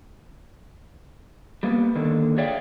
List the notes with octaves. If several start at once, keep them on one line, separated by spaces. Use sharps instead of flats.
G3 A#3 B3
D3 D#3 A#3
G#4 C#5 D5 E5 F5 G5